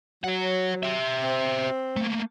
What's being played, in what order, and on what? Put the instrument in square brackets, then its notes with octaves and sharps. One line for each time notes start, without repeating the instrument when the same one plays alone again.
[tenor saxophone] F#3 [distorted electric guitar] C#5 F#5
[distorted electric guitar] G4 E5
[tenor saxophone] C4
[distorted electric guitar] A3 A#3